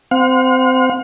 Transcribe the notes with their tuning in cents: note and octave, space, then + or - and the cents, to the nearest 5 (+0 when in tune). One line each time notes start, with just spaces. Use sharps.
C4 -20 F5 +45